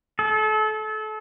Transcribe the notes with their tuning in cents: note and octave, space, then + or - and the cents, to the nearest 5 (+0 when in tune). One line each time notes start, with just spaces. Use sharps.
A4 -30